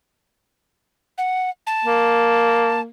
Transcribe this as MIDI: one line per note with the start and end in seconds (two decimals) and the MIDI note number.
1.18 1.50 78
1.67 2.81 81
1.84 2.88 58